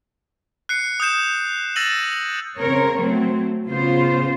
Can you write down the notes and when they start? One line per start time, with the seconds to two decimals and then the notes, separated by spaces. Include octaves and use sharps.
0.69 F#6 C7 C#7
1.00 D#6 F#6 G6 E7
1.76 E6 A6 A#6 D#7 E7 F#7
2.58 C#3 C4 A#4 C#5
2.97 F#3 A3 C4
3.68 C#3 B3 F4 C5